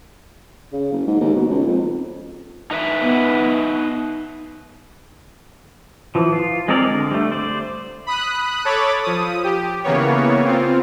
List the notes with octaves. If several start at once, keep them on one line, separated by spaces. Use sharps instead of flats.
C#3
F#1
G#2
D#2
B2
C#2
F2
D#4 B4 E5
B3
E3 F3
F4
G#3 C4 D#4 A#4 D5
D3
G3 A3
C5 D5
B5 D#6 F#6
A4 C#5 B5 D6 A6
F3 D#6
G4
C#3 E3 A#3 B3 C#5
C4 F4